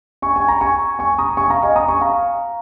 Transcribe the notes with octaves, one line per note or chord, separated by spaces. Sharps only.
G#5 C#6
G#5
A#5
G#5 C#6
G#5 C#6
A#5 D#6
G#5 C#6
F5 A#5
D#5 G#5
A#5 D#6
G#5 C#6
F5 A#5